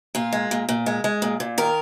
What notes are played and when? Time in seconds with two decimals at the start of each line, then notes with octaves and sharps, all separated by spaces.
0.15 A#2 F4
0.32 G#3
0.51 A#2
0.69 A#2
0.86 G#3
1.04 G#3
1.22 A#2
1.40 A#2
1.58 D#3 A#4